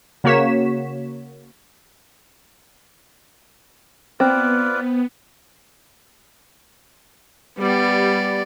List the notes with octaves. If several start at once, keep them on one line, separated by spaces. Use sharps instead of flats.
C#3 A#3 F#4 C#5 B6 E7
B3 C4 F4 B4 D5
G3 B3 D5